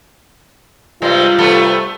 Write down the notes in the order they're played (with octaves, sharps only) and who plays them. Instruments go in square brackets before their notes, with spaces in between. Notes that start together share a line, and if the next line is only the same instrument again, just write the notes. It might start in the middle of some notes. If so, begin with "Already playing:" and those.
[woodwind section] G2 G3 [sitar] C3 G#3 [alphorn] F4
[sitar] C3 A3 B3